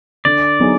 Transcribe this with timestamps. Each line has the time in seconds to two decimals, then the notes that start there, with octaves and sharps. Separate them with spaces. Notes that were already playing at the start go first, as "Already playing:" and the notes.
0.25 D3 D5
0.60 F#3 B3 D#4 G#4